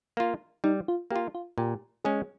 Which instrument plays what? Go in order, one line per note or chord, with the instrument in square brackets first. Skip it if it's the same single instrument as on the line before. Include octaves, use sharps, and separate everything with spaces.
[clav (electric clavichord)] A#3 F4
[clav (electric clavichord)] G3 [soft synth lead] D#4
[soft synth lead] F4
[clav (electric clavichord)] A#3 [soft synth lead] G4
[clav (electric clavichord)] F4
[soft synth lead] F4
[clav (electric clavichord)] A#2 [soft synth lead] G4
[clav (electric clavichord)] G#3 C#4 [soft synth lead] G#4